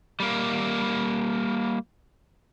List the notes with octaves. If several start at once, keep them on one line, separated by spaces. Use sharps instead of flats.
G3 A#3